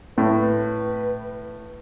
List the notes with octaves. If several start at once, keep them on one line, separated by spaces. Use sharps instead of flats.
A2 B4